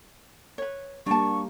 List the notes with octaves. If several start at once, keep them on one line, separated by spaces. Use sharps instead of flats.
B4 C#5
G3 A#3 D4 A5 C#6